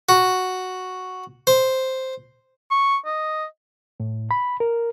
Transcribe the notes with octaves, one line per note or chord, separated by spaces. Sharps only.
F#4
C5
C#6
D#5
A2
B5
A#4